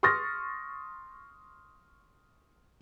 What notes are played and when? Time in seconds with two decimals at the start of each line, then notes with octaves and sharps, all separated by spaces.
0.03 C6 C#6 D#6 F6 A6 A#6